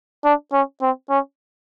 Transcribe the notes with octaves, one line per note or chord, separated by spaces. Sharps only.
D4
C#4
C4
C#4